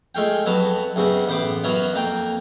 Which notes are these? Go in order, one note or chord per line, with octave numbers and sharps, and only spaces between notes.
G#3 A3 F4 G5
F2 F#3 B3 A5
F#2 C#3 B3 C4
A1 B3 C5 D6
F#2 F#3 B3 F4
F2 A#3 G5